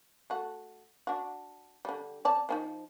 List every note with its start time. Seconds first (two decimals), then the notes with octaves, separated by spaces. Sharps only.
0.30 A3 F#4
1.07 D4 F#4
1.85 D3 G3
2.25 C4 D5 A5
2.49 F3 C#4 D#4